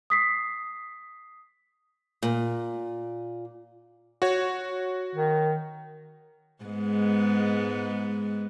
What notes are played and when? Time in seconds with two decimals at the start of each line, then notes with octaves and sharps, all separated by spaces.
0.10 D#6 B6 C7
2.23 A#2
4.22 F#4 C#5
5.15 D#3
6.64 G#2 G#3 B3